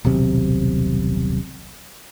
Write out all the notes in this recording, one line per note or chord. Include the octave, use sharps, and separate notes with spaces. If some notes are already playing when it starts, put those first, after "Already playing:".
D#1 B1 C3